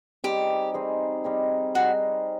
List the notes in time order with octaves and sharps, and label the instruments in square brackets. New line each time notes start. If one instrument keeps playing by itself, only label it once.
[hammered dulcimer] G3 C4 D#4 G#4 [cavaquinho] G4
[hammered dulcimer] G3 C4 D#4 G#4
G3 C4 D#4 G#4
[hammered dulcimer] G3 C4 D#4 G#4 [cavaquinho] F#4